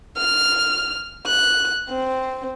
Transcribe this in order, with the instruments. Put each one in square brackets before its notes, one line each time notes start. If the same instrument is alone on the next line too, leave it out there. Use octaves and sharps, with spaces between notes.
[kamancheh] F6
F#6
C4